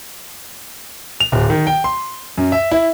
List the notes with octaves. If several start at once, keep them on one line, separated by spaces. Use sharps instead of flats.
F7
D1
D#3
G5
C6
F#2
E5
E4